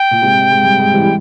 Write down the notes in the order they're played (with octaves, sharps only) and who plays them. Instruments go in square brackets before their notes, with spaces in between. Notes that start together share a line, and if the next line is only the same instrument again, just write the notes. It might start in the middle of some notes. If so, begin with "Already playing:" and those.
Already playing: [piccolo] G5
[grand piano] A#2
G#2 C3
G#2
G#2
G2
G#2
E3 G3
G3